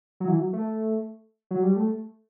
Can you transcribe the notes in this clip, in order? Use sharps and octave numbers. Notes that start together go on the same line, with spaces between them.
F#3
E3
F#3
A3
F#3
G3
A3